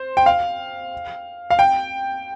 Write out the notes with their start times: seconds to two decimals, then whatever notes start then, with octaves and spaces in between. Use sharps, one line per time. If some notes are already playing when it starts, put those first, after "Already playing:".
Already playing: C5
0.17 G5
0.26 F5
1.50 F5
1.59 G5